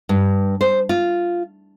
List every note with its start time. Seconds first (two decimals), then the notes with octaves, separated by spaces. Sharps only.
0.09 G2
0.61 C5
0.89 F4